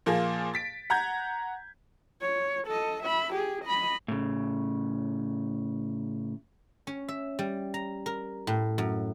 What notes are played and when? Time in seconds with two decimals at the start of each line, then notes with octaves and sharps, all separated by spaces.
0.06 A#2 F3 A#3 G#4
0.54 A6 B6 D7
0.90 F#5 A#5 G6 G#6
2.21 C#5
2.67 A4 D#5
3.03 E5 B5
3.33 G4 G#4
3.65 D#5 B5
4.08 A2 C#3
6.87 C#4
7.08 E5
7.39 G3
7.74 A#5
8.06 A#4
8.47 A2
8.78 F#2